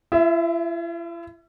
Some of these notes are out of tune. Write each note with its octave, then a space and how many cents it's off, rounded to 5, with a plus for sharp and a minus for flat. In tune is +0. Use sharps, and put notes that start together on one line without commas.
E4 +45 E5 +0